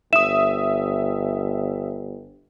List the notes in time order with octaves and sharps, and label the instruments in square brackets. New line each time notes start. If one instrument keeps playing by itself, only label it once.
[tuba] G1 [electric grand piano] E5 D#6 [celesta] E7